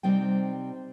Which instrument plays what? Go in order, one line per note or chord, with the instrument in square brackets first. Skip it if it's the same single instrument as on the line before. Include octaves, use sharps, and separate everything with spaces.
[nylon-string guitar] C3 G3 C4 D#4 G5